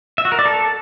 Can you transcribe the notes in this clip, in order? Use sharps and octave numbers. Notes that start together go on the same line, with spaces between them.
E5
F#4
A#4
D5
A4